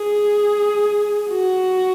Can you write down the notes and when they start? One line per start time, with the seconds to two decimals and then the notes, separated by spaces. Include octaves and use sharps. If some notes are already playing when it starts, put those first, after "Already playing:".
Already playing: G#4
1.31 F#4